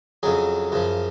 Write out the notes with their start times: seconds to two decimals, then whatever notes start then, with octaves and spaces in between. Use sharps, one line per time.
0.23 F2 C#3 F#3 G#4
0.72 F#2 C#3 F3